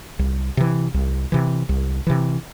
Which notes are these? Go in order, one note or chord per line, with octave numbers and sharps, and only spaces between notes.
C2
C3 E3
C2
C3 E3
C2
C3 E3